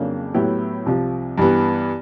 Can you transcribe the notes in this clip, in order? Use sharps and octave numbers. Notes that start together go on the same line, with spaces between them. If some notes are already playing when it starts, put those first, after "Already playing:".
Already playing: F2 C#3 F#3 A#3 D4
A2 F#3 B3 E4 G4
C2 C3 F3
G2 E3 G3 B3